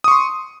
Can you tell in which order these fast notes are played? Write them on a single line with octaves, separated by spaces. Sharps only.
D#6 C#6 C6